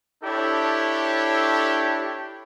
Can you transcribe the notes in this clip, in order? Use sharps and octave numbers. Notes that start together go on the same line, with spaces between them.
D4 E4 G4 A4 C#5